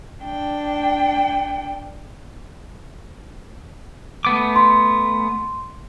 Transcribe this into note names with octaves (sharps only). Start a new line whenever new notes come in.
D4 G5
A3 B3 D6
C6